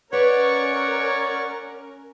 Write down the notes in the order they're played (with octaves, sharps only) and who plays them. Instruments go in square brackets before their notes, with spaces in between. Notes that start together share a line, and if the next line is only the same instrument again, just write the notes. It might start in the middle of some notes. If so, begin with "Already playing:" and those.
[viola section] C#4 A#4 [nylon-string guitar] B4 [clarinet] C#5 [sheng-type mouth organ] D5 F#5 C#6